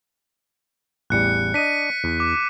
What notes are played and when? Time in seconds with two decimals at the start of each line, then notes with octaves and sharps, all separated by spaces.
1.10 A1 E2 G3 F#6 C#7
1.54 D4 D#5 B6 D#7
2.04 E2
2.20 D6